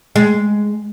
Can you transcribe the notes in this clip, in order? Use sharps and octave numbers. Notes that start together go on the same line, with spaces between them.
G#3